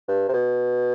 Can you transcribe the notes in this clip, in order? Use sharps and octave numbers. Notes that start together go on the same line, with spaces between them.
G2
C3
B2